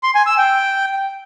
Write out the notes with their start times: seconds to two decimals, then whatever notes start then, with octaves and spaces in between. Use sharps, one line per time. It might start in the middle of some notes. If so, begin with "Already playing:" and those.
0.03 C6
0.15 G#5
0.26 E6
0.38 G5